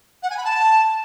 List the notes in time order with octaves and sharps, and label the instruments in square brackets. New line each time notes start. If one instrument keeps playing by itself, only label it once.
[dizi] F#5
G#5
B5
A5